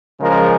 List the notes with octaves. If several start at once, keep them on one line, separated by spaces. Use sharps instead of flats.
C#3 F3 G#3 A#4